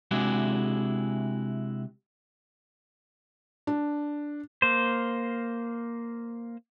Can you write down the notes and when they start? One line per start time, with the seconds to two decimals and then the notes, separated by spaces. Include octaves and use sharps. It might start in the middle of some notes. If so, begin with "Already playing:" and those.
0.11 C3 G#3 D4 E4 F#4 G#4
3.67 D4
4.62 A#3 C5